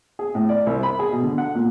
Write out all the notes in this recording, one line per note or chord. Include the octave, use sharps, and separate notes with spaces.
G#4
A2
D5
C2
B5
G#4
B2
D3
F#5
A#2